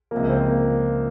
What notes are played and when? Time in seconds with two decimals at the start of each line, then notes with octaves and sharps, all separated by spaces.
0.11 C#2 C3 F3 A#3
0.29 C4
0.48 A#3